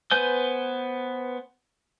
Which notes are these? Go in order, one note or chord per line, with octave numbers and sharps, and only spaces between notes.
B3 B4 C5 G#5 G6